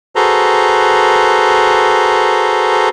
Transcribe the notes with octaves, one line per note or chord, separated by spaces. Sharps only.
F#4 G#4 A4 B4 C5 A#5